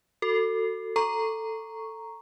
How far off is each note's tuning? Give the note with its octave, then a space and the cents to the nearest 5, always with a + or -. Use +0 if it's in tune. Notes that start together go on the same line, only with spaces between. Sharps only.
F#4 +0 A4 +25
A4 +10 A#5 +0 C#6 +0